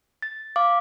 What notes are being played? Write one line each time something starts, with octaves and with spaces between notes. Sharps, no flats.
A6
F5 D6